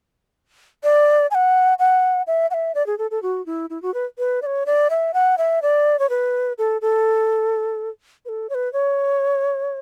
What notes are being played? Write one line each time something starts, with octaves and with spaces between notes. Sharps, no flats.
D5
G#5
F#5
F#5
E5
F#5
E5
D5
G#4
A4
A4
F#4
E4
E4
F#4
B4
B4
D5
C#5
D5
E5
F#5
E5
D5
C#5
B4
A4
A4
B4
A4
C#5
B4
C#5